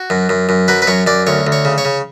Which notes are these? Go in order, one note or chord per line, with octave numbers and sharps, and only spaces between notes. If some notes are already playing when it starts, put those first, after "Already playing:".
Already playing: F#4
F#2
F#2
F#2
F#3 B4
B4
F#2 C#5
F#2 D5
D2 C#5
D2
C#5
C#3
C#5
C#3